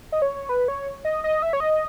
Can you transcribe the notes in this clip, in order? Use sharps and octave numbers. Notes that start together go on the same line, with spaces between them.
D#5
C#5
B4
C#5
D#5
D#5
E5
C#5
D#5